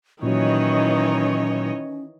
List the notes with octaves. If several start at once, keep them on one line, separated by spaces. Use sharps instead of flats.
A#2 D#3 E3 F#3 C#4 C#5 D#5